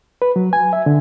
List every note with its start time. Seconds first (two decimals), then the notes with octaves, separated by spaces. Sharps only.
0.22 B4
0.36 F#3
0.53 G#5
0.73 E5
0.86 D3